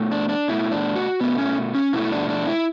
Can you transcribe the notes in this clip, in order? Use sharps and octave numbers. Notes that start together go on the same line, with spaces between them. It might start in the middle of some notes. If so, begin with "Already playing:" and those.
Already playing: B2 A3
D4
D4
B2 A3 E4
D4
F#4
B2 A3 B3
C#4
C#4
B2 A3 E4
D4
D4
E4